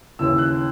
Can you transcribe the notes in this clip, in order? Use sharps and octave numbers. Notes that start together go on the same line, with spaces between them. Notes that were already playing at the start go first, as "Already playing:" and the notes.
D#2 C#3 E3 E6
F#6